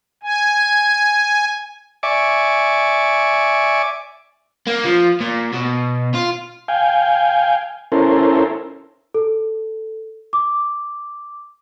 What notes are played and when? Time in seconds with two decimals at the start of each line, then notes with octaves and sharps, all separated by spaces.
0.23 G#5
2.03 D5 E5 G#5 C#6 D6
4.67 A#3
4.85 F3
5.20 A#2
5.53 B2
6.15 F4
6.68 F5 G5 G#5
7.92 C#4 E4 A4 A#4 C5
9.14 A4
10.33 D6